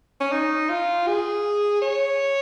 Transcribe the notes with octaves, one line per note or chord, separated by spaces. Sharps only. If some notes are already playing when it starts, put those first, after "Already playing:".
C#4
D#4
F4
G#4
C#5